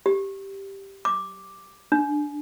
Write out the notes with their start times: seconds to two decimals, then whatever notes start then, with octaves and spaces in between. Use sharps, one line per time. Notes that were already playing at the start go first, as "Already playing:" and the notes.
0.06 G4
1.05 D6
1.92 D4